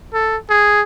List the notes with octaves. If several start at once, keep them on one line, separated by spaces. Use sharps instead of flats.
A4
G#4